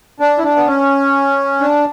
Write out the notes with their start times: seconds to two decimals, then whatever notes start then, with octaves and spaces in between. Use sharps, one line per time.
0.20 D4
0.38 E4
0.43 D4
0.56 B3
0.67 C#4
1.61 D4